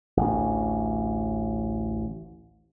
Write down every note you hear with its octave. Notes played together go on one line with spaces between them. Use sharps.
A1 D2